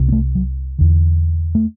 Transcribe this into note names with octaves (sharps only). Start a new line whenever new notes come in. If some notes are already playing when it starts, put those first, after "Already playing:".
Already playing: C2 C3
B3
A3
F#3
E2 D3
A3